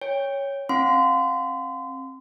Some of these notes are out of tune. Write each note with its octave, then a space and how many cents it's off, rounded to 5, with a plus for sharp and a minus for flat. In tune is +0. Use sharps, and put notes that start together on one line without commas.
C#5 +0 G5 +30
C4 +35 F5 +15 C6 -30